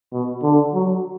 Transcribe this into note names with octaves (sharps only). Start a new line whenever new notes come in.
B2
D3
F#3